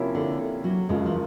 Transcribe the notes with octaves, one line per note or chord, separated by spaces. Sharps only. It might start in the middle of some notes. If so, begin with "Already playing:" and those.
Already playing: C3 F3 A#3 C#4 E4
D3
F#3
F#1 F#2 C#3 F3 G#3
E3